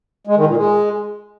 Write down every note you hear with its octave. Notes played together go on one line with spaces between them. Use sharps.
G#3
D#3
A#2
G#3